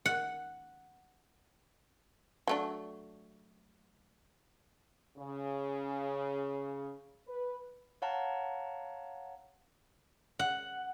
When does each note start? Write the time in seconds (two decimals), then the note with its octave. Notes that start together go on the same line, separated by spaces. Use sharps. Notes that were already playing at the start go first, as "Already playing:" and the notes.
0.06 F#5
2.48 F#3 A3 D4
5.17 C#3
7.28 B4
8.02 C#5 F5 F#5 A5 A#5
10.39 F#5